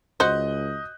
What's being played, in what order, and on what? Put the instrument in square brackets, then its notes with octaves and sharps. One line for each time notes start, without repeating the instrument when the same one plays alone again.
[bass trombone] C#2 [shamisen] F#4 C5 [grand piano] D#5 F#6 G6